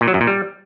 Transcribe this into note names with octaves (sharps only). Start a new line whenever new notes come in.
A#2
F#3
F#2
A#2
G3